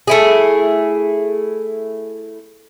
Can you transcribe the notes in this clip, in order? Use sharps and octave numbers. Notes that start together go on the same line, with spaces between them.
A3 E4 G#4